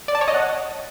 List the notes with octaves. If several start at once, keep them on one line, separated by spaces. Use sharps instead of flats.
D5
A5
C#5
D#5
F#5